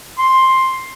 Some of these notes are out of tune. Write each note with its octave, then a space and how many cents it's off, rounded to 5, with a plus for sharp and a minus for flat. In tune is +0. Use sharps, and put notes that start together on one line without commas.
C6 +10